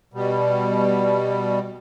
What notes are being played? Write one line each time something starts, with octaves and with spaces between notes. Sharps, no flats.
B2 G3